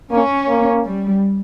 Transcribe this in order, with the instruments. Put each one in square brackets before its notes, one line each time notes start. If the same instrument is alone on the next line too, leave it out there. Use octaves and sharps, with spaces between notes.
[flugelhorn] A#3 [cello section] C#4
[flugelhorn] A#3
[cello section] G3